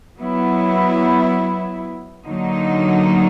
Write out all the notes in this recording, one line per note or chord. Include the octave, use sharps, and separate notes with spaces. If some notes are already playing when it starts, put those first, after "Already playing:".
F#3 B3 E4
D3 F#3 A#3 D#4